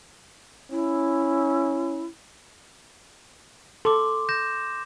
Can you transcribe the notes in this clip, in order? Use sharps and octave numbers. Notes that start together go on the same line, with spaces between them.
C#4 E4
A4 C6 D6
G6 A#6 E7